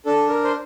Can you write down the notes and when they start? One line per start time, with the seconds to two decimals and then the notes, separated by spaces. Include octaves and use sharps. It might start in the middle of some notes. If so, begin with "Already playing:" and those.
0.06 D4 A4
0.29 A#4
0.44 C5